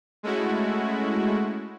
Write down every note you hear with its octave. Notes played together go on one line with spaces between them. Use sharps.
G#3 A3 C#4 E4 F#4